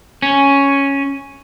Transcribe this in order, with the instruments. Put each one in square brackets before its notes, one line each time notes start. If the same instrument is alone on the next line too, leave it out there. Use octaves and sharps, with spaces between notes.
[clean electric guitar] C#4